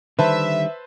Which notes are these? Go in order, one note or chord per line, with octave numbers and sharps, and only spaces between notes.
D3 D#3 G3 B4 C5 E5 A5